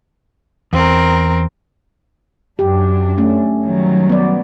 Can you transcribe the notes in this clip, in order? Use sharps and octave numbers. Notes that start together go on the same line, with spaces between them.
E2 C4 A#4
F#2 D4 G4
A3 C#4
D#3 F#3 G3
B3 D5